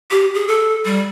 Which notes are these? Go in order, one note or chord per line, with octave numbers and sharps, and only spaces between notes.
G4
G#4
A4
G3